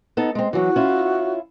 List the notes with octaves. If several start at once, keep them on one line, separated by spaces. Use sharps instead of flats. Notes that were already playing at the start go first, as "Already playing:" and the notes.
B3 D#4 A4
G#3 C4
E3 F#3 F#4
C#4 E4 F4